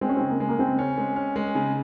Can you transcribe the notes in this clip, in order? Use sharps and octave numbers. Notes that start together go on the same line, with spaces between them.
G#3 C4
C#4
C#3 C4
A#3
G#3
A#3
C#3 C4
C#4
G#3
C#4
G#3
C#3